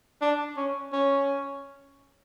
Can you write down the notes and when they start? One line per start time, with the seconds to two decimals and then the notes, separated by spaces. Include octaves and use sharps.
0.21 D4
0.57 C#4
0.93 C#4